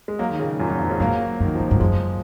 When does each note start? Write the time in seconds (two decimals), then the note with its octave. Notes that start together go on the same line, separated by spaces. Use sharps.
0.08 G#3
0.19 F#3 A#3
0.30 D#3
0.40 A#2 C#3
0.60 F#2 A#2
0.70 F#2
0.79 F2 G#2
0.90 C#3 F3
1.00 G#2 F#3 A#3
1.40 F#2 D#3
1.55 F2 F3
1.68 G#2 F#3
1.80 F#2 F3 G#3